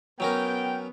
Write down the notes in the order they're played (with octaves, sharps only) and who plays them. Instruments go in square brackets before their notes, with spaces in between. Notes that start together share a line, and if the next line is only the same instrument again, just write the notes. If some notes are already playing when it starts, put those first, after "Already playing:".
[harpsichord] F#3 C#4 A#4 [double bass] B3 [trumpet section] G5